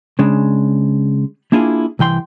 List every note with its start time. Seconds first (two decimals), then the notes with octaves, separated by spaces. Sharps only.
0.19 C#3 G#3 D4
1.52 A#3 D4 E4 F4 G#4
1.99 C2 E3 G5 C6